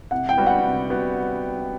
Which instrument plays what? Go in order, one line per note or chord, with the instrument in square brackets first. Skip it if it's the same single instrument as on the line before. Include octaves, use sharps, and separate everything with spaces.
[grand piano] C3 [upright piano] F#5
[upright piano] G5
[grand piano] G3 B3 F#4
[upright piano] F#5
[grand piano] C3
G3 B3 F#4